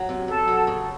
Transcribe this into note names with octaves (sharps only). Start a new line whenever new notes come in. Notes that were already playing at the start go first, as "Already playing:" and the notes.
Already playing: F#3
C3
F#2 A4
F#3
C#3